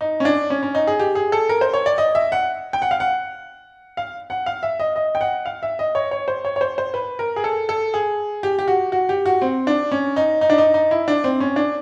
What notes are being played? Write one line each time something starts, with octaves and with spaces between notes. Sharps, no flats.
D#4
C#4
D4
C#4
C#4
D#4
G#4
G4
G#4
A4
A#4
C5
C#5
D5
D#5
E5
F#5
G5
F#5
F5
F#5
F5
F#5
F5
E5
D#5
D#5
G5
F#5
F5
E5
D#5
C#5
C#5
C5
C#5
C#5
C5
C5
B4
A#4
G#4
A4
A4
G#4
G4
G4
F#4
F#4
G4
F#4
C4
D4
C#4
D#4
D#4
D4
D#4
D#4
E4
D4
C4
C#4
D4